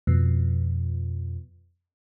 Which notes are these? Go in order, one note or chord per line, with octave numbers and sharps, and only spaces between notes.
F2 B2